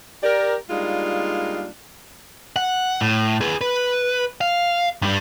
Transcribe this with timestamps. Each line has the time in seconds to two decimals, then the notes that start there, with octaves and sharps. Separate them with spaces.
0.23 G4 A#4 D5
0.70 G3 G#3 A#3 D4 D#4 F4
2.56 F#5
3.01 A2
3.41 G#4 B4
3.61 B4
4.41 F5
5.02 G2 G3